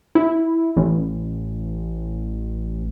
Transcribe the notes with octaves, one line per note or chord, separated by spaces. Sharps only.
E4
A1